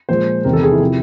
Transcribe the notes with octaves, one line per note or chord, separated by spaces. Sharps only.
A#2 F3 G#3 C5
E2 C3 D#3 A#4
A4
G#4
E4
C3 F3